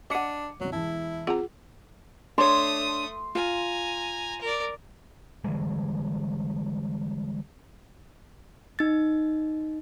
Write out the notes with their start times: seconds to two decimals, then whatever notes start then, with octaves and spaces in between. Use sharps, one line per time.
0.10 D4 D#5 F#5 D6 C#7 D#7
0.60 G1 C2 F#3
0.72 E1 E3 E4 A5
1.27 C4 F4 G#4 F#5 A#5
2.38 A3 D4 C#5 C6 D#6
3.35 F4 G#5 A#5
4.41 A#4 D5
5.44 D3 E3 G3 G#3
8.79 D#4 A6